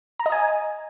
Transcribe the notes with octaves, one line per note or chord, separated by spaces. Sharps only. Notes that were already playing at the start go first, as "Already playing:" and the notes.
A#5
D#5
G#5